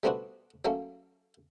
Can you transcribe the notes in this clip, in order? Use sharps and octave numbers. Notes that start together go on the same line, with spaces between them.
G3 A3 B3 C4 D4 F#4
F#3 A3 A#3 C#4